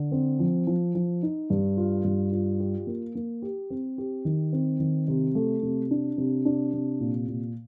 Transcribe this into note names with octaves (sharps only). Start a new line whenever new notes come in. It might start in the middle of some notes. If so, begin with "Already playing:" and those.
Already playing: D3
C4
F3
F3
F3
D#4
G2
F4
G2
F4
G4
A#3
A#3
G4
C4
G4
D#3
C4
D#3
C3
A3
C3
D4
C3
D4
C3
A#2
A#2